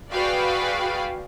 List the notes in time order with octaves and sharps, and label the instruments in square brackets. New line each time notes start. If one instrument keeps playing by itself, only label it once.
[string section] F#4 G#4 B4 D5 F5 G5